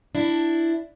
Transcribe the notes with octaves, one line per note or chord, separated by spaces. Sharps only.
D4 E4